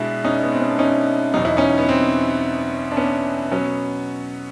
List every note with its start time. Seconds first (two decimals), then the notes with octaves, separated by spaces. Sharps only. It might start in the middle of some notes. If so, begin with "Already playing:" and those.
Already playing: B2 G#3 D4 E4
0.24 C#4 D#4
0.43 B3
0.52 C4
0.60 C#4
0.71 D4
0.79 C#4 D#4
1.34 E2 B2 F#3 D#4
1.45 E4
1.57 C#4 D#4
1.78 B3
1.89 C4
2.92 D4
2.97 B3 C#4
3.52 B2 F#3 B3 C#4